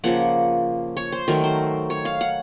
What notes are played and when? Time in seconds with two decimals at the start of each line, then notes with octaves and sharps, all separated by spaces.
0.04 C#3 F3 A#3 F#5
0.97 C#5
1.12 C5
1.28 D#3 F#3 A3 A#4
1.44 C5
1.90 C#5
2.05 F5
2.21 F#5